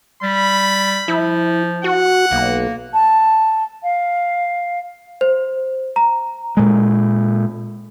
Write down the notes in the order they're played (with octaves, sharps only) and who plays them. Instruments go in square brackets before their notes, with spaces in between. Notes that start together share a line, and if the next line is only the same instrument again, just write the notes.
[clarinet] G3 [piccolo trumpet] B5
[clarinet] F3 [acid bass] E4
[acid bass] F#4 [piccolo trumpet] F#5
[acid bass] B1 [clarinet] A#3
[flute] A5
F5
[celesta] C5
A#5
[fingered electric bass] A#2 G#3